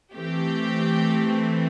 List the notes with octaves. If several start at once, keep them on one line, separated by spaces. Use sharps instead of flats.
E3 A3 C4 G4